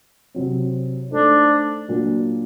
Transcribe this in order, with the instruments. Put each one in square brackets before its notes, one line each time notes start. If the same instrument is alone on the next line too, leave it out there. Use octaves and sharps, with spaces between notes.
[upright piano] C3 F#3 C4
[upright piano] A3 D#4 A4 C5 [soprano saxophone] D4
[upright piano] A#2 F#3 A#3 D4 F#4